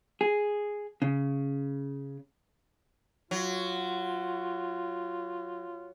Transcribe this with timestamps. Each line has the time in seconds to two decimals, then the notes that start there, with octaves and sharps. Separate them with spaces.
0.21 G#4
1.02 C#3
3.31 F#3 F4